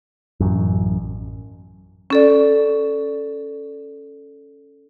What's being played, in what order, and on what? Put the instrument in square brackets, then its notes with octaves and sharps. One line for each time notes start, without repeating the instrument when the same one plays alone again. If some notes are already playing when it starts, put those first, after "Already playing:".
[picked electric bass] A1 F#2
[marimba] C#4 A4 D5